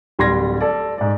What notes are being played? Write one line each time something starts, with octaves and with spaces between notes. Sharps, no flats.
D1 G3 C6 G#6 A#6
A4 D5
G#2 D5